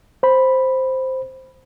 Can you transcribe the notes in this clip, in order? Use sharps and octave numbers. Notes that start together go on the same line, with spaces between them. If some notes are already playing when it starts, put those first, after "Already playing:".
C5 B5